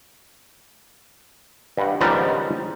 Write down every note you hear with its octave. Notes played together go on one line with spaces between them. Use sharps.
G2 F#5
C#2 G#2 D#3 F3 G3 B3